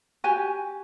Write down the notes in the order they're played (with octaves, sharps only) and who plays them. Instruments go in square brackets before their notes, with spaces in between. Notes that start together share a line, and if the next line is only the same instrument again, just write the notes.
[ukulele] F#4 G4 G#5